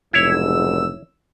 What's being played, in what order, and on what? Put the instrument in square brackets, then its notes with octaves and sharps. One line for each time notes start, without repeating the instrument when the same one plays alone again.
[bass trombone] F1 [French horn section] G#2 C#3 F#3 [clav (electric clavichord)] E4 C#5 [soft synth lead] E6